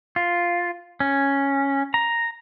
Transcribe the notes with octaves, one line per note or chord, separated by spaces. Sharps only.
F4
C#4
A#5